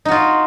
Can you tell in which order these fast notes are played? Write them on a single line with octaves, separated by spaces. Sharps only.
D#4 F#4 F4